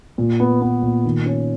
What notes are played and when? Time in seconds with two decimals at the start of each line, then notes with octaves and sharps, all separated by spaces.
0.18 A#2
0.40 B3
0.62 B3
0.82 A#2
1.05 D#3
1.26 C#4